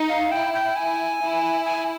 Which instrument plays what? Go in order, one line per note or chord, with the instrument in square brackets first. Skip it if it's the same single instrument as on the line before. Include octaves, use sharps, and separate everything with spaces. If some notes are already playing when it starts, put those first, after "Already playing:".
Already playing: [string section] D#4
[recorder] F5
[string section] E4 [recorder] G5
[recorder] G5
G#5
[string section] E4
[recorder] G#5